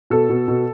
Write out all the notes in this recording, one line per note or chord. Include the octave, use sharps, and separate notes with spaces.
B2 A4
B2
B2